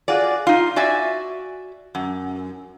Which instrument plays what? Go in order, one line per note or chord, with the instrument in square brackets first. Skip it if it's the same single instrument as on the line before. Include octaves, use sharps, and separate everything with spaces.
[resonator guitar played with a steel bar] F4 F#4 G#4 D5
D#4 F4
F#4 D5 E5 G#5
F#2